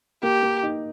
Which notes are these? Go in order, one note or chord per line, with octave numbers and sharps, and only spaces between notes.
A#3 G4
A#3
D#4